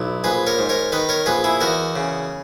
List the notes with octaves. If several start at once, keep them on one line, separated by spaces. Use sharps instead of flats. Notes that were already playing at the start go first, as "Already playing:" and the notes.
Already playing: B1 E4
A#1 G#4 B4
A#4 C#5
G#2
A#4 C#5
D#3 B4 D#5
A#4 C#5
A#1 G#4 B4
E4 G#4
E2 F#4 A#4
C#3